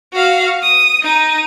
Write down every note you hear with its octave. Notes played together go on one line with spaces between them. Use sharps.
F#4 F5
D#6
D#4 D#7